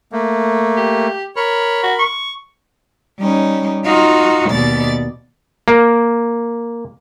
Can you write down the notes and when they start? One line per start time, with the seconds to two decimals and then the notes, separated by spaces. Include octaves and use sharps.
0.12 A3 A#3
0.77 G4
1.36 A#4 C#5 B5
1.83 F#4
1.99 C#6
3.20 G3 C#4 D#4
3.85 D#4 F4 F#4
4.50 D#2 B2 D5 A6
5.68 A#3